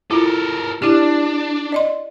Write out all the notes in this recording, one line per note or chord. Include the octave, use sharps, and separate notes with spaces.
E4 F4 A4 A#4
D4 E4 G4
D5 D#5 C6